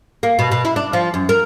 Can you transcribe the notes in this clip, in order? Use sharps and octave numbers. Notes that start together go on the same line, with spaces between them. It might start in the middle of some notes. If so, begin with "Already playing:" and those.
A#3
B2
B2
E4
D4
F3
F#2
A#4